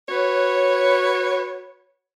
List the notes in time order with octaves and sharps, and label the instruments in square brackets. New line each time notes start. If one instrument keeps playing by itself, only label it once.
[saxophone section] F#4 B4 C#5